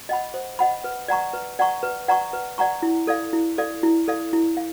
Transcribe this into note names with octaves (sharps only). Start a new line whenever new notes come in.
D#5 F#5 B5
C5
D#5 F#5 B5
B4
D5 F#5 A#5 C#6
B4
D5 F#5 A#5 C#6
B4
D5 F#5 A#5 C#6
B4
D5 F#5 A#5 C#6
E4
A4 D5 F5
E4
A4 D5 F5
E4
A4 D5 F5
E4
F5